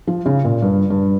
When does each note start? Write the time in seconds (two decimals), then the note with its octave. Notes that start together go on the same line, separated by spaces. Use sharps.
0.07 F3
0.26 C#3
0.45 A#2
0.62 G2
0.90 G2